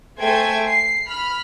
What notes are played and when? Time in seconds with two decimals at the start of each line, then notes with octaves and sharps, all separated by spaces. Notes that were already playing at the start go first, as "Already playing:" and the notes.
0.19 A3 C5 G5 G#5 G#6
0.67 C7
1.07 B5 F6